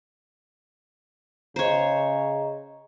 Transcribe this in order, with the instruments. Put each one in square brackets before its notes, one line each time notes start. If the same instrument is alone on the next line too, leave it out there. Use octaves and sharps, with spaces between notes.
[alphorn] C#3 [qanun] C5 C#5 [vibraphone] D#5 A#5